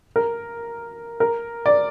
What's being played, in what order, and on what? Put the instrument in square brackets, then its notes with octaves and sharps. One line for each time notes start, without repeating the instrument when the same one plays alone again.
[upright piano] A#4
A#4
D5